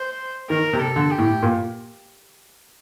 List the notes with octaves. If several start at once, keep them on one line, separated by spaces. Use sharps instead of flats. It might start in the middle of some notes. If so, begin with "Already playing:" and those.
Already playing: C5
D#3 A#4
C3
A4
D3
G4
A2
A#2